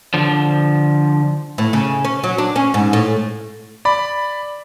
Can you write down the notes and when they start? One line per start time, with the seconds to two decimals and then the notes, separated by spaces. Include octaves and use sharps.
0.14 D3 F3
1.58 A2
1.73 C#3
2.05 C#4
2.24 F#3
2.38 D4
2.56 C#4
2.74 G#2
2.93 A2
3.85 D5 B5